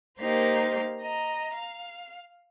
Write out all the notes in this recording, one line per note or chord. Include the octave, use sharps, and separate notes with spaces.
A#3 D#4 G4 A#4 C5 F5
D#5 A#5
F5